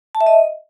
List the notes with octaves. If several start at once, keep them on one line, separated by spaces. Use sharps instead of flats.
A5
E5
D#5